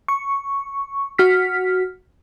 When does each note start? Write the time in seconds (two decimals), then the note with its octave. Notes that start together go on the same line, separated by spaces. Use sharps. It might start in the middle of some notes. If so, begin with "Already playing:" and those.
0.08 C#6
1.18 F#4 F6 B6